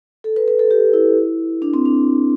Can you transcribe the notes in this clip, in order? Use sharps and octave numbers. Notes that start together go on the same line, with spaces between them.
A4
B4
B4
A4
G4
E4
D4
C4
D4